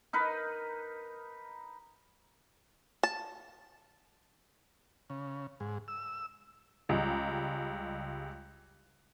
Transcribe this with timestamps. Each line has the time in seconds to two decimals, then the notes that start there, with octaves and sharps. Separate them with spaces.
0.13 D#4 A#4 B4
3.03 A5
5.10 C#3
5.60 G#2
5.88 E6
6.89 C#2 G3 G#3